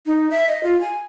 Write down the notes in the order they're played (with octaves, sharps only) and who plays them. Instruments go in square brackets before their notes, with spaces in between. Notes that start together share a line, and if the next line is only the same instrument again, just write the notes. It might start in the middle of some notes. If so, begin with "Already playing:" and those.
[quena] D#4
E5
D#5
F4
G#5